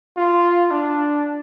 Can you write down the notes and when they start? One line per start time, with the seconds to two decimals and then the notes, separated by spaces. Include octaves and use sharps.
0.17 F4
0.71 D4